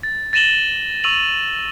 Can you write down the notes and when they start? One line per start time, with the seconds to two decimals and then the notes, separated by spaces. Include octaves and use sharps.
0.03 A6
0.33 A6 A#6 D#7 E7 F#7 G7
1.04 C#6 E6 D#7 F7 F#7